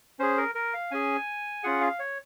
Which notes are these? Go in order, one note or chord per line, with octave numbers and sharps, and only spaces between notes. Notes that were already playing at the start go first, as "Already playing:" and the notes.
C#4 G#4 C5
A#4
A#4
F5
C#4 G#4 G#5
C#4 F4 G#4 F#5
F5
C#5